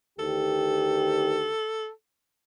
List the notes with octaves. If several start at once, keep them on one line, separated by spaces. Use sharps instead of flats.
D2 D#3 G4 A4